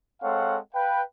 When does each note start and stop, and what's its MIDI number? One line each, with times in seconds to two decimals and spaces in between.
0.23 0.58 56
0.23 0.58 60
0.23 0.58 69
0.23 0.58 73
0.23 0.58 77
0.23 0.58 78
0.74 1.02 71
0.74 1.02 77
0.74 1.02 79